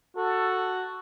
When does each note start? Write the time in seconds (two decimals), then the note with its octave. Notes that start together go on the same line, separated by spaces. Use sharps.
0.16 F#4 A4